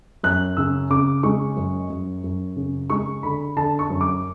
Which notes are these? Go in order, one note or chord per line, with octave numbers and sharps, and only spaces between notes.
F#2 F#6
C#3 E6
C#3 D6
G#3 C#6
F#2
F#2
F#2
C#3
G#3 C#6
D3 B5
D3 A5
C#6
F#2
D6